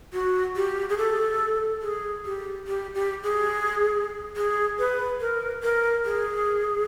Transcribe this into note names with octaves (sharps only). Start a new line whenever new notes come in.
F#4
G4
G#4
A4
G#4
G4
G4
G4
G#4
G#4
B4
A#4
A#4
G#4